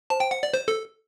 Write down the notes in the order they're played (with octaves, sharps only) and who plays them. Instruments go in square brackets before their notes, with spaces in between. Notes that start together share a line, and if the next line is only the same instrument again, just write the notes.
[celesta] C5 [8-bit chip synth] A5
[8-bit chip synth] G5
F#5
D5
C5
A4